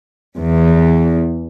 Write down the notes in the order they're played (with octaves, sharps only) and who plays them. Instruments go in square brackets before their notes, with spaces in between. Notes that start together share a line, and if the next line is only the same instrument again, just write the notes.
[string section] E2